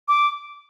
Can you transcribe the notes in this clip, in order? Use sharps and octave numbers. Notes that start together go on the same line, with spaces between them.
D6